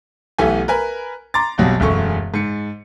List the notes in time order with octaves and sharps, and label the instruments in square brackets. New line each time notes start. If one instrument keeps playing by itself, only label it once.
[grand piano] B1 E3 A3 B3 G4 G#5
A#4 B4 G#5 B5
A#5 C6 D6 A6
A#1 F2 B2 F#3 G3
E1 F#2 A3 C#6
G#2 C#7